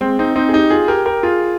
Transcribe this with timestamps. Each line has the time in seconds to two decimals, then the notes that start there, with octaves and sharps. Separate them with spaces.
0.01 G#3 C4
0.19 C4 D#4
0.36 C4 D#4
0.49 G#4
0.53 D#4 G4
0.70 F4 G#4
0.88 G4 A#4
1.06 G4 A#4
1.23 F4 G#4